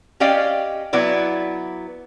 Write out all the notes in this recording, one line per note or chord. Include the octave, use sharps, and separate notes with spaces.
C#4 G4 D5 D#5 F5 G5
F#3 B3 E4 D5